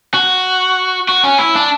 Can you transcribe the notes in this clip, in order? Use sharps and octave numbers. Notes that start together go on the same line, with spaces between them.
F#4
F#4
C#4
E4
D4